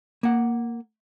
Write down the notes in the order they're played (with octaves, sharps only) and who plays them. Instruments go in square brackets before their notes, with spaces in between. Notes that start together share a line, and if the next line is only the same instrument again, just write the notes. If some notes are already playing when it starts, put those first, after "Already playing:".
[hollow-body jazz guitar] A#3 F#5